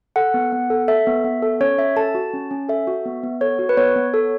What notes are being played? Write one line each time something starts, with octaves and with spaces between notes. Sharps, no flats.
A4 F#5
B3
B3
A4
A4 E5
B3
B3
A4
C#4 C#5
C#4 E5
A4 A5
F#4
C#4
C#4
A4 E5
F#4
B3
B3
A4 C#5
F#4
B4
B3 C#5
B3
A4